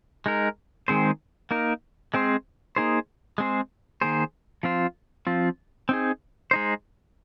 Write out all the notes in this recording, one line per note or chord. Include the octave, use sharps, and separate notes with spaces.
G#3 D#4 A#4
D#3 G#3 C4 G#4 C5
A#3 D#4 A#4
G#3 C4 G#4 C5
A#3 D#4 G#4 C5
G#3 C4 G#4 C5
D#3 A#3 G#4 C5
F3 C4 F4 C5
F3 C4 F4
C4 D#4 G#4
G#3 D#4 C5